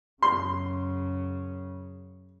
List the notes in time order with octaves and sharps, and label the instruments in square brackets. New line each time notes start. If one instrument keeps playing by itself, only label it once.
[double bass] F#2 C#3 [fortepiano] C6